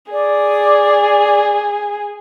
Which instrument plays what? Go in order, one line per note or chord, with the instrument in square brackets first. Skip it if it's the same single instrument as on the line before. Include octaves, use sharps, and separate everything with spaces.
[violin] G#4 [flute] D5